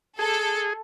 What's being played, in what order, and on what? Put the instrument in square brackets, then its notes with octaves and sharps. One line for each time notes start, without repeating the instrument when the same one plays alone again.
[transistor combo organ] G#4 [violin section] A4